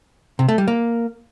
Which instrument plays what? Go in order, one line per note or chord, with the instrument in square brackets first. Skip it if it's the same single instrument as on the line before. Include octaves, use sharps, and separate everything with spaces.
[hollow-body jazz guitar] C3
A3
G3
A#3